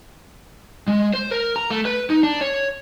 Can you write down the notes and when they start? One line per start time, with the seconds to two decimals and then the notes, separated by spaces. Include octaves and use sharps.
0.87 G#3
1.14 C5
1.31 A#4
1.56 A#5
1.70 A3
1.85 B4
2.10 D#4
2.23 D4
2.41 C#5